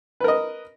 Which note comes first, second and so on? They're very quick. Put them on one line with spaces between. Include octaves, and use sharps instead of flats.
B4 A#4 D#5